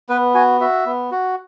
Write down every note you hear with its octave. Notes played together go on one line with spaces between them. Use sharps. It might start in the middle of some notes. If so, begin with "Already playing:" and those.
B3 B4
F#4 G#5
F#4 E5
B3
F#4